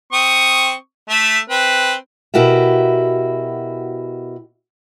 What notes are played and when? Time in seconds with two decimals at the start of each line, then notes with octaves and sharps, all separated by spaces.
0.13 C4 C#6 D#6
1.10 A3 E5
1.50 C4 B4
2.34 B2 E4 F#4 G4 A#4 E5